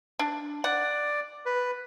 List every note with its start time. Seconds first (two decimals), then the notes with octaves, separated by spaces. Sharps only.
0.19 D4
0.64 D5 F#5
1.46 B4